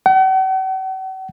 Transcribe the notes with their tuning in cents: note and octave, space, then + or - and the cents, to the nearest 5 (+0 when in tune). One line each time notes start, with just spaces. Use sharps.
F#5 +45